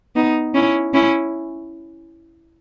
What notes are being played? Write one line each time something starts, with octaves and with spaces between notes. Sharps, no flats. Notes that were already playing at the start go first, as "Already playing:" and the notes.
B3 D#4
C#4 E4
C#4 E4